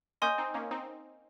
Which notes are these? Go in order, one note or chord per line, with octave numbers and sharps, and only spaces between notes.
A#3 C#4 D#5 G#5 C6 D#6 G6
C4 D#4
A#3 C#4
C4 D#4